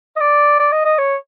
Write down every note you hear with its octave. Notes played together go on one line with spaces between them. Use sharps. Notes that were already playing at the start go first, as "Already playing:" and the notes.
D#5
D5
D5
D#5
D#5
C#5